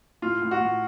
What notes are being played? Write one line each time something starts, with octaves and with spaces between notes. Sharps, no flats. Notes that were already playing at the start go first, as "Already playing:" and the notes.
A2 F4
A2
F#4
A2